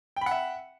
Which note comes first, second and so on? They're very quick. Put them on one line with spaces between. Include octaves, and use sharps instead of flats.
G5 B5 F#5 E5